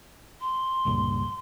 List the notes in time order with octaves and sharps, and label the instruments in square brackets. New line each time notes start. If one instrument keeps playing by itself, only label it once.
[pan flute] C6
[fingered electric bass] C#2 G2 A#2